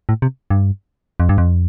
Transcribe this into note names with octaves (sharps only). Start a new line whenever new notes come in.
A2
C3
G2
F2
G2
F2